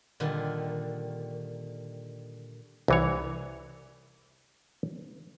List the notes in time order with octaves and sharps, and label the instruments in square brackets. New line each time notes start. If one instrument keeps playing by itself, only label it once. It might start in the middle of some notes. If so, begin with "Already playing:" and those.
[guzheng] A#2 D3 D#3 G3
[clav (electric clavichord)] C2 E3 C#5